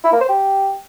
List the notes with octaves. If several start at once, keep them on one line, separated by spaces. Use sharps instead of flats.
E4
A#3
C5
G4